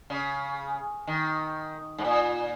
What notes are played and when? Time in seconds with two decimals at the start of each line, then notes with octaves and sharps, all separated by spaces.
0.10 C#3
1.07 D#3
1.98 G#2
2.05 A#2